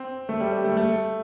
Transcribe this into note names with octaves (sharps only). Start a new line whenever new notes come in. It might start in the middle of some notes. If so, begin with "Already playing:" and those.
Already playing: C4
A3
G3
G3
A3
A3